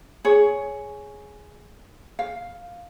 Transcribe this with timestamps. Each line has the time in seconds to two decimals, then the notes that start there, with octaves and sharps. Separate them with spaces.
0.25 G#4 C#5
2.19 F5